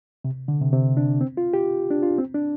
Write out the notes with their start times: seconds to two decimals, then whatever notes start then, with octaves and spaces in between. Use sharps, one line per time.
0.25 C3
0.48 D3
0.61 C3
0.73 C3
0.97 D4
1.21 C4
1.37 F4
1.53 G4
1.91 D4
2.03 F4
2.18 C4
2.34 D4